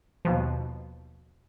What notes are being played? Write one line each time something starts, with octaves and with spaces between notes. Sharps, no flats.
D#2 B2 F3